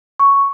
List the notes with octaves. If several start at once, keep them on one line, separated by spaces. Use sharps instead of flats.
C#6